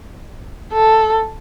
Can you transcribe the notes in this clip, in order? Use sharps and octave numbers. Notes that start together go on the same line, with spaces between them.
A4